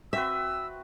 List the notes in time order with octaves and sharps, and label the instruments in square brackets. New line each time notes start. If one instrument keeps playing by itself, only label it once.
[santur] C4 F#4 B4 [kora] E5 [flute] E6